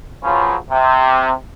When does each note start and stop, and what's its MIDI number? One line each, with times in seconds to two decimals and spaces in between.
0.24 0.55 49
0.24 0.55 53
0.24 0.55 54
0.24 0.55 61
0.24 0.55 65
0.24 0.55 71
0.71 1.32 48